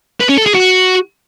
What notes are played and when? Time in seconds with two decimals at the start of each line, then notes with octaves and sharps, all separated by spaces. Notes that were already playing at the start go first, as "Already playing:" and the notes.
0.21 B4
0.29 C#4
0.38 A4
0.46 G#4
0.55 F#4